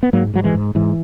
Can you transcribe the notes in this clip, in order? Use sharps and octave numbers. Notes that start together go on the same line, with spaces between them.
B3
G#2 F#3 A#3
G#2 F#3
E3 G#3
G#2
G#2 E3